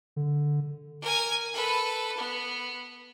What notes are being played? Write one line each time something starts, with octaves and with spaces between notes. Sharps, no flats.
D3
A#4 G#5
A4 B4
B3